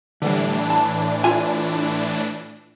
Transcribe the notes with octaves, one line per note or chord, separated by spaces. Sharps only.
A2 D3 E3 G3 D4
A5
F4 G#5